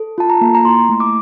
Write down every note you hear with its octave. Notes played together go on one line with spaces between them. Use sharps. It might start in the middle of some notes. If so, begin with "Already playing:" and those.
Already playing: A4
F4 A5
A#5
A#3
A#5
E4 C6
A3
D6